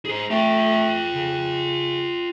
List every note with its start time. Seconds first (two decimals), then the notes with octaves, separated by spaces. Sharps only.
0.05 G#4 C5
0.30 A3 F4 G5
1.14 C#3